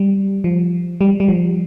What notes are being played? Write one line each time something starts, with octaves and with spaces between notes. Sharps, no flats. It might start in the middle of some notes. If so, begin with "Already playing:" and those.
Already playing: G3
F3
G3
G3
F3